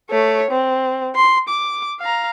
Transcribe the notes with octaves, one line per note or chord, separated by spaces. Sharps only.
A3 C#5
C4
C6
D6
F5 A#5